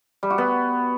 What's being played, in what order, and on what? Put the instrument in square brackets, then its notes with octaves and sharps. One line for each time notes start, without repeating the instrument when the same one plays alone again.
[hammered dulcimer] G3
F#4
B3